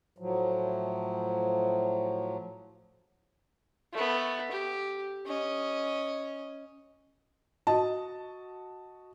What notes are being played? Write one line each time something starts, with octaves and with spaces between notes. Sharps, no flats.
A2 F3 F#3
A3 B3
G4
C#4 D#5
F#4 D#5 A5